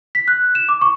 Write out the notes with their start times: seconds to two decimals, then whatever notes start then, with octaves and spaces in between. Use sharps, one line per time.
0.15 B6
0.28 F#6
0.55 E7
0.69 D6
0.81 C#6